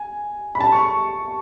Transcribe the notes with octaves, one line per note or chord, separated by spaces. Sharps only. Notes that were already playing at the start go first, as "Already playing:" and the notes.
Already playing: G#5
B5
A5
C#6